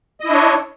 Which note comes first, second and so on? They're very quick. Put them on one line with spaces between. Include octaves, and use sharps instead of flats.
D#5 E4 D4 C#5